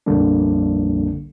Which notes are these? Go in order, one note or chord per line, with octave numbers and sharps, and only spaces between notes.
A#1 F2 D3 G3 A#3 D4